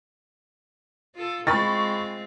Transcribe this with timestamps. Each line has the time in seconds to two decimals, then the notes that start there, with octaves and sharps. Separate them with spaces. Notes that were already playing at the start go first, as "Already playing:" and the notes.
1.15 F4 A4
1.47 G#3 C4 F4 B5 C#6 A6